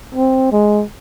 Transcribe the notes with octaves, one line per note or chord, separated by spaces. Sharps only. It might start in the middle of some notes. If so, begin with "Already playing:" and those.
C4
G#3